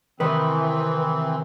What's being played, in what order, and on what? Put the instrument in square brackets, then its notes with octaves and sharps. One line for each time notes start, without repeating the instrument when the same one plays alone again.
[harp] C3 D#3 [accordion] E3 C4 [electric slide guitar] B4